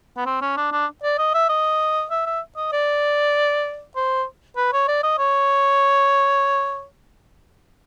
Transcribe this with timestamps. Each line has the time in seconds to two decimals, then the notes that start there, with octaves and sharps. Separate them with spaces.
0.17 B3
0.26 C4
0.42 C#4
0.57 D4
0.72 D4
1.03 D5
1.18 D#5
1.34 E5
1.49 D#5
2.10 E5
2.26 E5
2.57 D#5
2.72 D5
3.96 C5
4.57 B4
4.73 C#5
4.88 D5
5.03 D#5
5.18 C#5